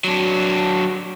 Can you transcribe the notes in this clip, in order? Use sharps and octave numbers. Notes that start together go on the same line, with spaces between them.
F#3 D4